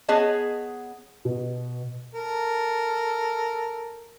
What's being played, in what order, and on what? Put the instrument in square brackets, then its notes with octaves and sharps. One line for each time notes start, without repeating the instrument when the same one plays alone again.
[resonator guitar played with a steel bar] B3 G#4 C#5 D#5 A5
[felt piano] B2
[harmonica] A4 A#4